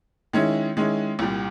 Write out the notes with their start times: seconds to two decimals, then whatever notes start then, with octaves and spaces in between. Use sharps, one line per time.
0.33 D#3 G#3 C#4 E4
0.77 D#3 G#3 C#4 E4
1.19 C2 A#2 G3